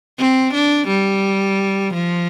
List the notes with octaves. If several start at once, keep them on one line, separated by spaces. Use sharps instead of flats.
C4
D4
G3
F3